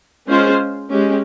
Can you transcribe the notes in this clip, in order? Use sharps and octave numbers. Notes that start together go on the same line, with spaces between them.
G#3 C#4 F4 G#4 C5
G#3 C#4 G4